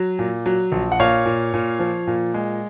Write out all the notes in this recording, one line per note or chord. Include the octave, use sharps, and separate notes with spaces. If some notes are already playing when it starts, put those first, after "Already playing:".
Already playing: F#3
A#2
F#3
A#1
F#5
A#2 C#5 F5
A#2
A#2
F3
A#2
G#3